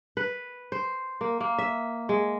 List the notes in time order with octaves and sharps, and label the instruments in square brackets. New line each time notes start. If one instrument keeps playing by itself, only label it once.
[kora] B4
C5
A#3
A#3
E5
G#3